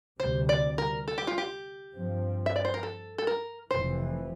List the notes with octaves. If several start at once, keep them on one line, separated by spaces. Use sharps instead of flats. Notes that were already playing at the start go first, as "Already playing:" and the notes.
D2 C3 G3 C5
D5
A#4
A4
G4
F4
G4
G2 F3 C4
E5
D5
C5
A#4
A4
A4
A#4
F1 F2 E3 C5